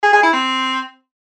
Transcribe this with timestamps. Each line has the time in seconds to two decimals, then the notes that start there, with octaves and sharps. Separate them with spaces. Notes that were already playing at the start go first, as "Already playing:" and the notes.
0.03 G#4
0.13 G#4
0.23 E4
0.33 C4